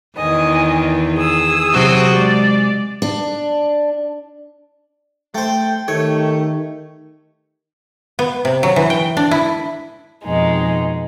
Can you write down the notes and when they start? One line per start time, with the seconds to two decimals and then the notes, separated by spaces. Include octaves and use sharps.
0.18 E2 D#3 D#5 G#5
1.17 G#4 D#6 E6
1.73 C3 F#3 F#4
2.13 G#3 D5
3.02 D4
5.35 A3 C5 G5
5.88 D#3 A3 G4 C#5
8.19 B3
8.45 C3
8.63 F#3
8.76 E3
8.90 G5
9.17 D4
9.31 E4
10.23 F2 B2 G#3 D#4